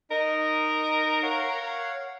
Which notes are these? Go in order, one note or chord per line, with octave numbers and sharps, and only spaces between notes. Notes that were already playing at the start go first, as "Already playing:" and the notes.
D#4 A#4 D#5
C#5 F5 F#5